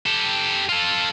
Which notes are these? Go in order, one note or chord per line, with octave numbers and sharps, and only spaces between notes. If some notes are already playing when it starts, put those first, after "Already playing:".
G4 A4
F4 A4